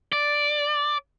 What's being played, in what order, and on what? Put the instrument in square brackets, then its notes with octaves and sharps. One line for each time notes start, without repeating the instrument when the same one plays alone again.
[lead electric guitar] D5